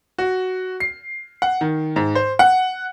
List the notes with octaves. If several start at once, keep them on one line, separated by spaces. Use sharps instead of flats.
F#4
C7
F#5
D#3
G#2
C5
F#5